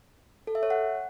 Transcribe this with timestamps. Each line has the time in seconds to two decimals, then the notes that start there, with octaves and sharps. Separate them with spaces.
0.47 A4
0.55 E5
0.63 C#5
0.70 F#5